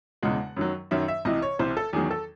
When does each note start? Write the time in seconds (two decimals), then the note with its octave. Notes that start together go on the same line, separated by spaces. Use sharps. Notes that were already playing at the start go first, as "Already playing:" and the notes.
0.23 E1 E2 C#3 G#3 F#5
0.56 F#2 D#3 F#3
0.91 F#2 D#3 F#3 E5
1.08 E5
1.25 C2 C3 E3 D#5
1.42 C#5
1.59 C2 C3 E3 C5
1.77 A4
1.93 E2 D#3 F#3 G#4
2.11 A4